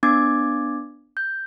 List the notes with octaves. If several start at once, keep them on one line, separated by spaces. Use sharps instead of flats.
B3 D4 D6 G#6 A6
G6